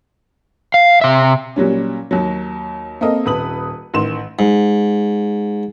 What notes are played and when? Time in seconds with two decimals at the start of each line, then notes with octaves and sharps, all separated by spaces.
0.74 F5
1.01 C3 E5
1.56 A#2 F#3 G3 C#4
2.11 D#2 F#3
3.01 A#3 C4 A4 A#4 D#5
3.26 D#1 B4 D#6 F#7
3.94 A1 D#3 C6 E7
4.39 G#2